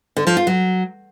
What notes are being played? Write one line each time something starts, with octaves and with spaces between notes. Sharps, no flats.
D3
F3
F4
F#3